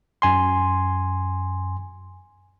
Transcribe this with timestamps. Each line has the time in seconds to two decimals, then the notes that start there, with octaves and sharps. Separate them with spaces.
0.22 F#2 G#5 C6